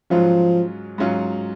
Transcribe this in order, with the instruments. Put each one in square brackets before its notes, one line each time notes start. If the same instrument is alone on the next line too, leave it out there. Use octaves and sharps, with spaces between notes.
[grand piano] G#2 F#3 C#4 F4 [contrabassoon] F3
[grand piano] G#2 F#3 C#4 F4